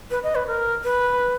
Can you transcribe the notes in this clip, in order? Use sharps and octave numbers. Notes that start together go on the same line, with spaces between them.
B4
D#5
B4
A#4
B4